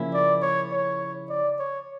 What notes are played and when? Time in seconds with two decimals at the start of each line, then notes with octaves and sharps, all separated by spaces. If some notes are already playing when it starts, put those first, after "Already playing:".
Already playing: C#3 F3 A#3 C#4 E4
0.14 D5
0.42 C#5
0.72 C#5
1.29 D5
1.59 C#5